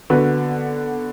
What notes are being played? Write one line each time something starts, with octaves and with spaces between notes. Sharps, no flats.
D3 B3 F#4 B4